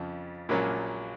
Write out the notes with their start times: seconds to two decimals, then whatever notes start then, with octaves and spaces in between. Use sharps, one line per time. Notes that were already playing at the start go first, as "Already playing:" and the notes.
Already playing: F2 C#3 F3
0.49 A#1 A#2 F#3 A#3 C#4